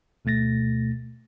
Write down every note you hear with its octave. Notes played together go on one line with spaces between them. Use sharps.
D2 B2 A3 A6 A#6